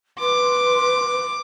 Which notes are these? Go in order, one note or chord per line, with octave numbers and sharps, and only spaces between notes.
B4 C6 D6